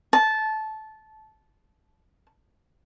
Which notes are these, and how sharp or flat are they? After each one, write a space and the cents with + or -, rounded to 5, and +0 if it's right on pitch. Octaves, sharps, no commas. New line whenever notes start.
A5 -15